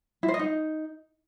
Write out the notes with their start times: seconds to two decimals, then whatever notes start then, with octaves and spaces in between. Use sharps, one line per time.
0.23 E4
0.28 C5
0.34 D#5
0.39 D#4